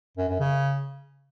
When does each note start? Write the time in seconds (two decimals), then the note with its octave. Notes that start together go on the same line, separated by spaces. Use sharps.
0.17 F#2
0.28 F#2
0.40 C#3